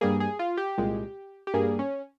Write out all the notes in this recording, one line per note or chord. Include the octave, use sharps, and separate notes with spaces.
G2 G3 A#3 G#4
G#4
F4
G4
C2 A#2 G#3
G4
G2 G3 A#3 G#4
C#4